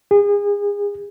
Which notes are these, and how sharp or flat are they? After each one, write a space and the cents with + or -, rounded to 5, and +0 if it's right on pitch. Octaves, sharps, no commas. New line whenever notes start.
G#4 -30